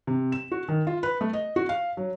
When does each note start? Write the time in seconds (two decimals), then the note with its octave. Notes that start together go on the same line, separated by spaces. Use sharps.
0.07 C3
0.32 E7
0.52 F#4
0.68 D#3
0.87 F4
1.03 B4
1.21 A3
1.33 D#5
1.56 F#4
1.69 F5
1.97 F#3